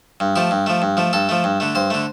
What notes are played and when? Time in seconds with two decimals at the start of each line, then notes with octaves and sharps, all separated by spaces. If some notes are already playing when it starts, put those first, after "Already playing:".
0.20 G2
0.36 F3 A3 G4
0.51 G2
0.66 F3 A3
0.82 G2
0.97 F3 A3
1.13 G2 A4
1.29 F3 A3
1.44 G2
1.60 D3 A3
1.75 G2 C5
1.90 D3 A3